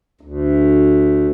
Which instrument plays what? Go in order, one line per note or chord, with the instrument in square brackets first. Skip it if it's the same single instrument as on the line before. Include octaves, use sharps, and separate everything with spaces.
[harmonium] D2